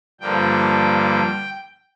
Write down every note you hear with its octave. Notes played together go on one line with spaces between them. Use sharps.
G2 D3 F3 A#3 G5